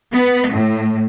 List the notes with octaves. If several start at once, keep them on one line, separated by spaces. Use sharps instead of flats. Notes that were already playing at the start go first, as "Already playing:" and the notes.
B3
A2